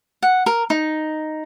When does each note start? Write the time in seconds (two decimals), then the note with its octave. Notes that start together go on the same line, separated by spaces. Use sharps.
0.22 F#5
0.46 A#4
0.70 D#4